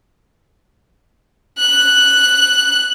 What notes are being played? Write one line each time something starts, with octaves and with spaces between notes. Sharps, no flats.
F#6